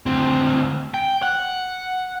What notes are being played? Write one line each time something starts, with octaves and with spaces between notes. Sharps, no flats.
D2 C4
G5
F#5